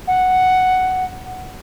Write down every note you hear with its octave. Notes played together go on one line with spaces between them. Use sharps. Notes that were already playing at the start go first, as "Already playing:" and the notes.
F#5